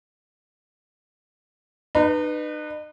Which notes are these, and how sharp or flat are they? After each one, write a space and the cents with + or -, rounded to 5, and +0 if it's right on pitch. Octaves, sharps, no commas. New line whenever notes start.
D#4 -40 B4 +0